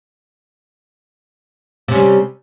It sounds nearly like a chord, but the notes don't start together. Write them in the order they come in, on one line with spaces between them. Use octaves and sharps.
C3 C#4 G3